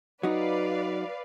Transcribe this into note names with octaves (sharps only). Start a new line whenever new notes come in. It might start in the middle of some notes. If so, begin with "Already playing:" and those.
F#3 D#4 B4 D5 F5